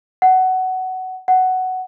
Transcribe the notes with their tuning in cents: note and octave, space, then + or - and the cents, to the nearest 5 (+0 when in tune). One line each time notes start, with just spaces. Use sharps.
F#5 +15
F#5 +10